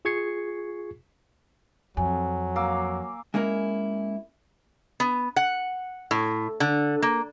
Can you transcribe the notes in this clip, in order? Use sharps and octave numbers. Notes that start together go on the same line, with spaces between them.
F4 G#4 C#6 G#6 C7 C#7
F2 F#3 G#5
A#3 F5 E6
G#3 A#3 C#4 E4 A#4
B3
F#5
A2
D3
A#3